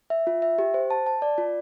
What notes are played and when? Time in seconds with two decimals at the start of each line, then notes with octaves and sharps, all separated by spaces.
0.10 E5
0.27 F4
0.42 E5
0.59 G4
0.74 C5
0.90 A5
1.06 A5
1.22 D5
1.38 F4